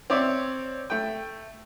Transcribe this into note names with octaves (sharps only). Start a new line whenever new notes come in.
C4 C#5 D5 E5
A3 G5